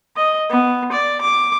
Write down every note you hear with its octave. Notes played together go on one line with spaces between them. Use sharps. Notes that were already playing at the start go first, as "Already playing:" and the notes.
D#5
B3
D5
D6